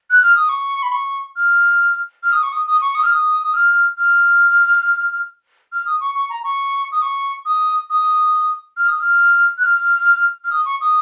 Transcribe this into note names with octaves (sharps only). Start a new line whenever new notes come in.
F#6
F6
D#6
C#6
B5
C#6
F6
F6
D#6
C#6
D#6
D#6
C#6
D#6
F6
D#6
D#6
F6
F6
F6
D#6
C#6
C#6
A#5
C#6
D#6
C#6
D#6
D#6
F6
D#6
F6
F#6
F6
F6
D#6
C#6
D#6